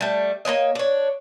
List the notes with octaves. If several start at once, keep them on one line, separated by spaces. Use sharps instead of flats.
G3 A3
A#3 B3 C#5 D#5
D4 C#5